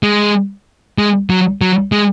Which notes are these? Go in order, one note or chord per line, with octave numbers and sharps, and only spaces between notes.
G#3
G#3
F#3
F#3
G#3